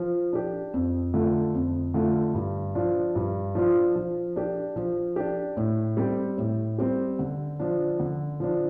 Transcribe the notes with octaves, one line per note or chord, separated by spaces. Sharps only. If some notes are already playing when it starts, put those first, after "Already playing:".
Already playing: F3
D4 G4
F2
D3 A3 F4 A4
F2
D3 A3 F4 A4
G2
F3 D4 F4
G2
F3 D4 F4
F3
D4 G4
F3
D4 G4
A2
G3 C4 G4
A2
G3 C4 G4
D3
F3 D4
D3
F3 D4